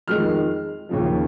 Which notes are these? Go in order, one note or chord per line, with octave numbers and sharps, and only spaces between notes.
F2 D#3 G#3 F6
D#2 C#3 F3